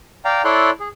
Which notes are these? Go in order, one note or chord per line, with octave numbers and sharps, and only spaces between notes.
D5 F5 G5 A#5
E4 A4 C#5 D5 C6 F#6
G#4